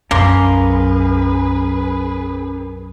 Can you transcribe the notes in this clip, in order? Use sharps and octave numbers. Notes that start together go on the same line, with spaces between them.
B1 F#2 A#3 C#4 G#4 A#4 B4 C6